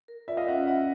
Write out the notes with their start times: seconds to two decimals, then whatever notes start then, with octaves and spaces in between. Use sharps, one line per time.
0.08 A#4
0.28 F4 D5 E5
0.37 D#5 F5
0.47 C#4 E5 F#5
0.67 D5 E5 F#5